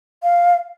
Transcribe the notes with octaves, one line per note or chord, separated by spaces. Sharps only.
F5